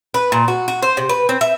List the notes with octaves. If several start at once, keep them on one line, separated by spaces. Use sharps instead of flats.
B4
A#2
F#4
F#4
C5
C3
B4
C4
E5